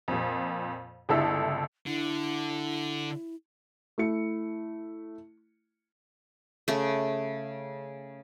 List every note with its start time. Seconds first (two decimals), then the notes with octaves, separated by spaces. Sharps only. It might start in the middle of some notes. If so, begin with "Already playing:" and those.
0.08 F2 A#2
1.09 G1 C#2 E4 A4 E5 E6
1.87 D3 E4
3.98 A3 E4 C#7
6.68 C#3 A3